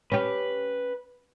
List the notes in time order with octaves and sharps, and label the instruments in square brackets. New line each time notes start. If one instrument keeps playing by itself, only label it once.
[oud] C#4 G4 [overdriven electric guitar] B4